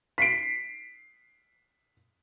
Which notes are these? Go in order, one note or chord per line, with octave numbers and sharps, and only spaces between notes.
B6 C7 D7